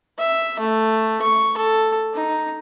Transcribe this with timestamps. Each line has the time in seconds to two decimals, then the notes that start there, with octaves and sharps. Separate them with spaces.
0.18 E5
0.59 A3
1.22 C#6
1.57 A4
2.14 D#4